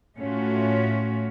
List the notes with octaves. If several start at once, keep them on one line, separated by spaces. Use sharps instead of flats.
A2 A3 C#4 F4 F#4